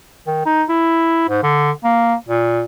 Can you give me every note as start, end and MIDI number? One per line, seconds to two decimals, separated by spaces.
0.27 0.43 51
0.46 0.63 63
0.69 1.26 64
1.29 1.42 44
1.43 1.71 50
1.84 2.15 58
2.28 2.63 46